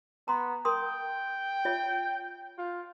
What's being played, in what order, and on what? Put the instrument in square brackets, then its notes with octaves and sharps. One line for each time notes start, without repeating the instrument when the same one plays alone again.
[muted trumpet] B3 [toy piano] A#5 C6
[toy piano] A#4 C6 D#6 [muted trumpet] G5
[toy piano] F4 C#5 E5
[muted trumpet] F4